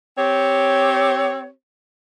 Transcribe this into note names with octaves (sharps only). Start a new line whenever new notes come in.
C4 G4 C#5